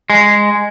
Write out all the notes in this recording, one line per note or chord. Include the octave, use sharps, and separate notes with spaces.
G#3